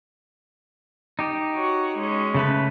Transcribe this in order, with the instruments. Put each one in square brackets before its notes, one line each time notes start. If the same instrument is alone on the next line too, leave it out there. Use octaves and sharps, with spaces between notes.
[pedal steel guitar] D#4 G4
[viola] F#4 C#5
G#3 C#4
[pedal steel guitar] C#3 A3 B4